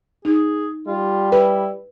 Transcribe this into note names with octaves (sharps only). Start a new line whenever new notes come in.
D#4 G#4
G3 F4
E4 B4